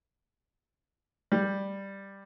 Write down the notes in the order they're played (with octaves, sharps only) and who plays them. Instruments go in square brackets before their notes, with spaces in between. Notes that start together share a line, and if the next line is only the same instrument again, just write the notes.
[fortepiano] G3